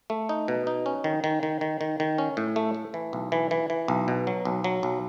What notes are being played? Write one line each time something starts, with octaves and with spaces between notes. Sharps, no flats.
A3
D#4
B2
D#4
C#4
D#3
D#3
D#3
D#3
D#3
D#3
C#4
A2
A3
A3
E3
B1
E3
E3
E3
B1
B2
F#3
B1
F#3
B1